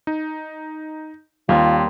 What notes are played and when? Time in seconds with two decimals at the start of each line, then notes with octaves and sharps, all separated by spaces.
0.07 D#4
1.49 D#2 G3 A#3 C4 F4